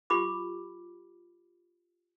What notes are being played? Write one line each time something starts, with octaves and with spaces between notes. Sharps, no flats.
F4 G4 B5 D6